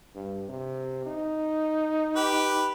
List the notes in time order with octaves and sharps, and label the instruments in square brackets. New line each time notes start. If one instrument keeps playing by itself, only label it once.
[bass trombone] G2
C3
D#4
[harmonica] G4 B4